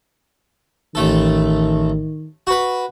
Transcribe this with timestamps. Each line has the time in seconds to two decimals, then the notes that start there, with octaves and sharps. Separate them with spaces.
0.95 A1 D#3 A3 A4
2.47 F#4 B4